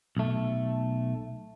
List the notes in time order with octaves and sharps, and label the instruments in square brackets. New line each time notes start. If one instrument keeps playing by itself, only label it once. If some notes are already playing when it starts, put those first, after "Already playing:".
[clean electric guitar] B1 A3